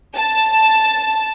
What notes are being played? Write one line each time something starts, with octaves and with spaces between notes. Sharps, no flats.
A5